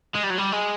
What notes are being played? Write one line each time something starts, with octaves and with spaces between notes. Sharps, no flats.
G#3
G3
F#3
G3
G#3